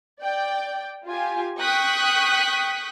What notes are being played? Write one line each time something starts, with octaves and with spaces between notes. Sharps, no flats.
D5 G5
F4 G4 G#5
G5 C#6 D#6 F#6 B6